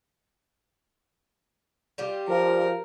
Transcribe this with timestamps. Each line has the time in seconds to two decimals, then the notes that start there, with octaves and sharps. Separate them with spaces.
1.98 G3 F4 G4
2.29 F3 A#4